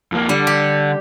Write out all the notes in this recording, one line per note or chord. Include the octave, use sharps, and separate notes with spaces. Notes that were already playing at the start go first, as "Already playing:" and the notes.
F2 A#3
D3 G3
G4